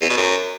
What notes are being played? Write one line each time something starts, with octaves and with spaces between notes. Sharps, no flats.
E2
B2
F#2